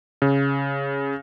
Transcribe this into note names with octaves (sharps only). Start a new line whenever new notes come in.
C#3